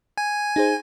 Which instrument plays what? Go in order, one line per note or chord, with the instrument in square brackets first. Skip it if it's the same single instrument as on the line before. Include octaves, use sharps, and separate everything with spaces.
[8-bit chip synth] G#5
[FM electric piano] D#4 G#4 C5